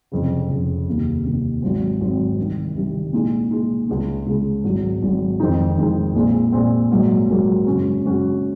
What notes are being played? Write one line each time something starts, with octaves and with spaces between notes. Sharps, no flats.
F1 F2 C#3
F1 F2 C#3
F1 D#2 D#3
F1 D#2 D#3
G#1 G#2 F#3 C4
G#1 G#2 F#3 C4
C2 C3 D#3
C2 C3 D#3
A#2 G#3 D#4
A#2 G#3 D#4
C#2 C#3 G#3
C#2 C#3 G#3
G#1 G#2 F#3
G#1 G#2 F#3
F2 D#3 G#3 C4 D#4
F2 D#3 G#3 C4 D#4
A#1 A#2 G#3 C4
A#1 A#2 G#3 C4
A#1 G#2 F#3 A#3
A#1 G#2 F#3 A#3
F#2 C#3 G#3 C#4 F#4
F#2 C#3 G#3 C#4 F#4